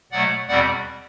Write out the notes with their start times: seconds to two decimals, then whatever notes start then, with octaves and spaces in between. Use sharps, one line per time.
0.12 B2 F#3 A3 D5 F#5
0.48 E2 B2 G3 C4 D5 F#5